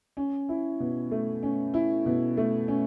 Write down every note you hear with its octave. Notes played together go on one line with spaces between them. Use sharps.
C#4
E4
B2
A3
C#4
E4
B2
A3
C#4